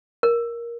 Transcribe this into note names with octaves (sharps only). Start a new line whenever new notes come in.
A#4